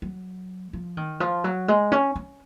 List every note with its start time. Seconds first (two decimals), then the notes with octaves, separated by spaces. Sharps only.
0.02 F#3
0.73 F3
0.97 D#3
1.20 F3
1.44 F#3
1.68 G#3
1.92 C#4
2.16 C#4